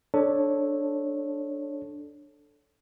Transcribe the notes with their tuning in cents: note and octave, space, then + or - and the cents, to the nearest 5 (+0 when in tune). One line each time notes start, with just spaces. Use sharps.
D4 +0 A4 +0 C#5 -15